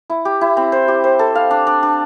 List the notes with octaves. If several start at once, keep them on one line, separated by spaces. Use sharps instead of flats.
E4
G4
E4
C4
C5
G4
C5
A4
F5
D4
D4
D4